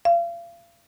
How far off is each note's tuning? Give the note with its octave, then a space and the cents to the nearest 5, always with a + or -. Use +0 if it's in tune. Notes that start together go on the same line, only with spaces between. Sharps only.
F5 -35